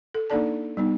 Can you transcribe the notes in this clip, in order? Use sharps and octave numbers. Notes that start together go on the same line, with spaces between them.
A4
A#3 D4 D#4 A4 D5 A5
G3 B3 D#4